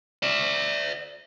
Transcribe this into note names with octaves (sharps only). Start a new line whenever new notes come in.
D5 E5